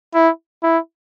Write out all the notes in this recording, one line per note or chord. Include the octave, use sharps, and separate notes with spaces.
E4
E4